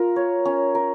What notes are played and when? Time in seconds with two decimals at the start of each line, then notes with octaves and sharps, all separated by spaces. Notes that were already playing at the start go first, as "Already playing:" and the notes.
Already playing: F4 A#4
0.16 C#5
0.45 C#4
0.75 A#4